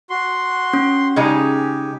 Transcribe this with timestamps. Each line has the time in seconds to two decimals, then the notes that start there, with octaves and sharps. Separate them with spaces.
0.10 F#4 C6
0.73 C#4
1.16 C#3 G#3 D#4 G4